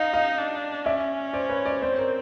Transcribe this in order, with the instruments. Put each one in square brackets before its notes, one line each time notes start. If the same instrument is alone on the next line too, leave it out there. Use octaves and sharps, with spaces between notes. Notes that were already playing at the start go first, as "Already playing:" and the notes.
Already playing: [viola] D#4 [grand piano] D#5 F5
[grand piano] D#5 F5
[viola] D4
[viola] C#4 [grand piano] D5 E5
[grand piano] C5 D5
B4 C#5
C5 D5
[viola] C4 [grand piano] C5 D5
[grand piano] C#5
A#4 C5